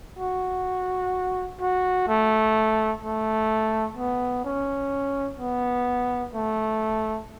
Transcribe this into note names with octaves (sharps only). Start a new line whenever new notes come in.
F#4
F#4
A3
A3
B3
C#4
B3
A3